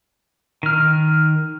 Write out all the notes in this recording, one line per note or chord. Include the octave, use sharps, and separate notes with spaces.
D#3 F6